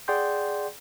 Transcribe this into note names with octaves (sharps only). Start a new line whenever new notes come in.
G#4 D5 F#5 G5 C6 G6